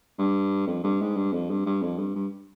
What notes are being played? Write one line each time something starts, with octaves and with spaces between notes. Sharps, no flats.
G2
F2
G2
G#2
G2
F2
G2
G2
F2
G2
G2